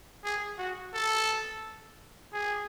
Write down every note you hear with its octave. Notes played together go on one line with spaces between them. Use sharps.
G#4
F#4
A4
G#4